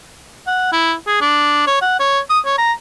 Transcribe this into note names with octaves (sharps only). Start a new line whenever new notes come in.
F#5
E4
G#4
D4
C#5
F#5
C#5
D#6
C#5
A#5